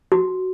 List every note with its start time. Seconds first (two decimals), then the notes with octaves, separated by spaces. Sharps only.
0.12 F#4